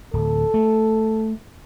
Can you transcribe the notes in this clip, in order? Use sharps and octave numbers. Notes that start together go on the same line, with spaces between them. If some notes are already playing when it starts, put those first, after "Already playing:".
D1 A4
A3